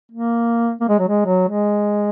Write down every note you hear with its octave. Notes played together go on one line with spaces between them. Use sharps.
A#3
A#3
G#3
F#3
G#3
F#3
G#3